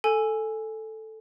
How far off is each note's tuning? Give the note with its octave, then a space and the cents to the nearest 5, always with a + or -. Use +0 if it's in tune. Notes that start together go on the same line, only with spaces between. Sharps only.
A4 +0 G#5 +0